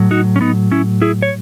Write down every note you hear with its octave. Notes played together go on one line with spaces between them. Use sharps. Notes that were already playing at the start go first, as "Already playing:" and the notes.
Already playing: A2 F#3
D#4 F#4
C#4
B3 D#4
C#4 E4
E4 G#4
C#5